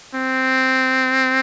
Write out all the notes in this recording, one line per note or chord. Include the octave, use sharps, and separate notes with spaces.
C4